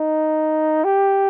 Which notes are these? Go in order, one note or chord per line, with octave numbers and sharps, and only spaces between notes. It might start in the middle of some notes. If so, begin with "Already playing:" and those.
Already playing: D#4
G4